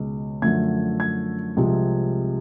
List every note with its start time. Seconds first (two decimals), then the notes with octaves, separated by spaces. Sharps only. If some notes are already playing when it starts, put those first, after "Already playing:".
Already playing: C#2 B2 G#3
0.42 F#2 D3 F3 A3 G#6
1.00 G#6
1.57 C2 C3 F3 G#3